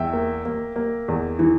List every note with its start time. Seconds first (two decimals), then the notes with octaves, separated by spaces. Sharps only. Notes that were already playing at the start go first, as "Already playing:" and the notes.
Already playing: E2 E5 G5
0.13 A#3
0.45 A#3
0.76 A#3
1.08 E2
1.39 E3